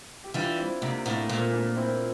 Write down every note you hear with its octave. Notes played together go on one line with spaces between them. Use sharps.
G4
E3 G3 D4 F4
C4 E4
C3 A#3 D4
A2 A#3 D4
A#2 A3 C4
A#3 D4
C4 E4